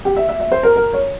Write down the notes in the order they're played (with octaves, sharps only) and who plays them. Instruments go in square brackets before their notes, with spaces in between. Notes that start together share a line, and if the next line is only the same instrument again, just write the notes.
[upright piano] G4
E5
E5
E5
C5
A#4
A#4
C#5